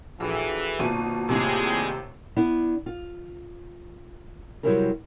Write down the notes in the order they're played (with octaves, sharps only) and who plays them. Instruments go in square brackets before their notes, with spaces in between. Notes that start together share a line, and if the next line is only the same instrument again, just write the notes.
[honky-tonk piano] A#1 [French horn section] E3 [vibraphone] F#4 G#4 A4
[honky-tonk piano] G#1 B2 D#7 [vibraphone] A#3 F4 A5
[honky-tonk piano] D#2 A2 C3 [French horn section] G3 G#3 G#4
[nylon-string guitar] B3 D4 E4
F4
C3 F#3 G3 E4 G#4 A#4